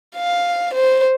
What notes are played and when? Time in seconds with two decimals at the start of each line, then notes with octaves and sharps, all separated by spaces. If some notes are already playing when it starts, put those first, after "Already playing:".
0.16 F5
0.74 C5